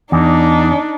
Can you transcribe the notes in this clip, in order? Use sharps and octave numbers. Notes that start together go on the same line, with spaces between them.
E2 D4 D#4